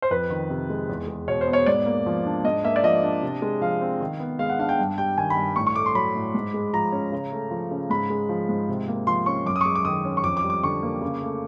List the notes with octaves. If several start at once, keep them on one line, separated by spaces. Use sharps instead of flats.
C5
F2 B4
D#3
C3
G#3
E2
G#3
B2 C#5
C5
B3
C#5
G#2 D5
A#3
F3
D4
G#2 D#5
A#3 E5
D5
F3 D#5
D4
C3
G#3
F3 F5
C4
D#3
B3
G#3 F5
F#5
D4 F5
G5
G2
G3 G5
D#3 G#5
B5
G2
A2 C#6
C#6
A3 D6
C6
F#3 B5
A2
G#2
G#3
F3 A#5
C#4
C#3
A3
F3
C#3
G#2 B5
G#3
F3
G#2
C3
A#3
F3 C6
C#4 C#6
F#2 D6
D#6
C#6
G#3 D6
D6
D#3 D#6
C#4
C#6
F2 D6
D6
G3
D6
D3 C#6
A#3
C#3
A3